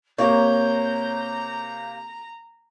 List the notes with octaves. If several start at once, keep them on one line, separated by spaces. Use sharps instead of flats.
C3 A#3 C#5 A#5 G6